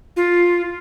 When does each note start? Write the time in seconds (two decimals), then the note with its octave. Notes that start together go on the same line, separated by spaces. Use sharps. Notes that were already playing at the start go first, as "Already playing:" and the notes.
0.16 F4